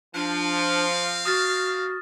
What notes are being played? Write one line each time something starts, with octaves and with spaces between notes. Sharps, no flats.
F3 C4 D4 F5
F#4 D#6 F6 A6